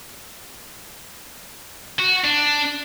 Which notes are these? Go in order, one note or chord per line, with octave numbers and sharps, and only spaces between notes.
F#4
D4